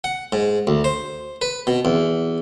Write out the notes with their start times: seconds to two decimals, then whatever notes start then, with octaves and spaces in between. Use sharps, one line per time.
0.04 F#5
0.33 G#2
0.67 D2
0.84 C5
1.42 B4
1.67 B2
1.85 E2